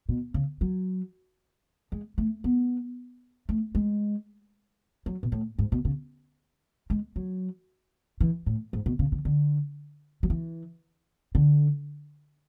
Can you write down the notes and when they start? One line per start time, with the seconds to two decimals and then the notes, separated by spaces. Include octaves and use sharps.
0.09 B2
0.34 C#3
0.61 F#3
1.92 G#3
2.18 A3
2.44 B3
3.49 A3
3.75 G#3
5.06 F#3
5.23 B2
5.32 A2
5.59 G#2
5.72 B2
5.85 C#3
6.90 G#3
7.16 F#3
8.21 E3
8.46 A2
8.73 G#2
8.86 B2
8.99 C#3
9.12 D3
9.25 D3
10.23 F#3
10.30 E3
11.35 D3